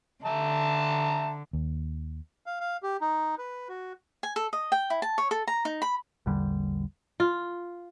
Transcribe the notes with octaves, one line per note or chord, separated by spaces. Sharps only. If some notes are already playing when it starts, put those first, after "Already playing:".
D3 E5 A5 A#5
D#2
F5
F5
G4
D#4
B4
F#4
G#5
A4
D#5
G5
E4
A5
C#5
A4
A#5
D#4
B5
A#1 E2 D3 G3
F4